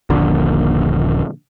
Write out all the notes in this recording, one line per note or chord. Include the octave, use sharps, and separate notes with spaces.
D#1 A#1 D3